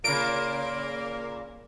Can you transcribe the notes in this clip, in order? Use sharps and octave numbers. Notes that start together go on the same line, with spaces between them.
A#2 C#3 A#3 A#4 D7